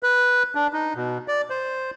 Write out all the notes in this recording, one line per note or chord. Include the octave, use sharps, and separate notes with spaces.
B4
D4
D#4
B2
D5
C5